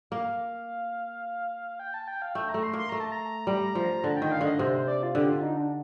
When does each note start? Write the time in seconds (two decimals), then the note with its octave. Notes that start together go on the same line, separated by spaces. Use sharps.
0.11 A#3 F5
1.80 G5
1.94 A5
2.08 G5
2.22 F5
2.35 A3 G5
2.49 A#5
2.54 A3
2.63 C6
2.73 A#3 C6
2.89 A3 A#5
3.00 A5
3.12 A#5
3.47 G3
3.75 F3
4.04 D3 A5
4.17 D#3 G5
4.31 F5
4.41 D3 D#5
4.59 C3 C5
4.74 C5
4.88 D5
5.03 F4
5.15 D3 G4
5.29 F4
5.43 D#4
5.57 D4